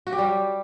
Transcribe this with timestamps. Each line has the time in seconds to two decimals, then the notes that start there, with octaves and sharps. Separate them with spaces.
0.07 F#4
0.13 G4
0.18 G3